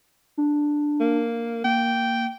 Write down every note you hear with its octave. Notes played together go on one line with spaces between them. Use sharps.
D4
A#3
A#3 G5